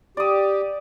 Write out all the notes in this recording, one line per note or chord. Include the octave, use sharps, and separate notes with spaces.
G4 D5 D#6